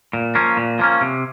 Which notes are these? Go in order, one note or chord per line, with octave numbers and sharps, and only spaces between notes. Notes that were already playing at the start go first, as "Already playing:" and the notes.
A#2
F3 A#3 C#4
A#2
F3 A#3 C#4
C3